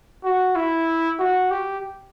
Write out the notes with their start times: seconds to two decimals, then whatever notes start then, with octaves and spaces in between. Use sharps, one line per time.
0.24 F#4
0.56 E4
1.19 F#4
1.51 G4